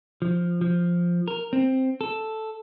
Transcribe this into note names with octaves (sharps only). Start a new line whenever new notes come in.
F3
F3
A#4
C4
A4